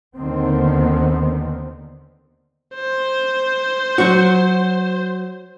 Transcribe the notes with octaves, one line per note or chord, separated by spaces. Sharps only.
D#2 D3 D#3 B3 C4
C5
F#3 F#4